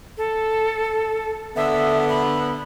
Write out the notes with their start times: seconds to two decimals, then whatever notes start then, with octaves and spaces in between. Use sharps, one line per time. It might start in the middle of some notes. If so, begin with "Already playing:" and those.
0.17 A4
1.56 D3 B3 E5
2.09 B5